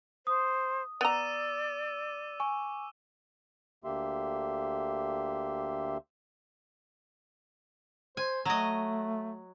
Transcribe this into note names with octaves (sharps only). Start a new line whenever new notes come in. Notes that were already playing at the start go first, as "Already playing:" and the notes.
C5 D#6
B3 D5 A#5 D6 E6 D#7
G#5 C#6
D2 D3 A#3 G4 E5 C6
C5 G#5
F#3 A3 D#5